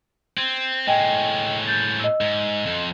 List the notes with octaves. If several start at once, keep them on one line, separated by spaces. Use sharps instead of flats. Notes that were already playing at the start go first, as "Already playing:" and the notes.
C4 G#6 D#7
A2 G#3 D#5 G5 G#5
G6 A6
D#5 E6
G#2
F2